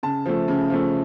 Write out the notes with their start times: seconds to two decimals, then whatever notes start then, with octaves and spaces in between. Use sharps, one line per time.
0.03 C#3 A5
0.25 F3 A3
0.48 C#3
0.70 F3 A3